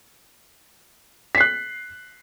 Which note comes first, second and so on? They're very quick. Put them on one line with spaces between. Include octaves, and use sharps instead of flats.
B6 C7 F#6